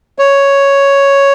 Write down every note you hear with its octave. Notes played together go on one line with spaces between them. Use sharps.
C#5